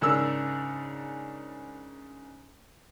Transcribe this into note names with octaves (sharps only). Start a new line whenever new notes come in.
G#2 C#3 D4 A#4 E6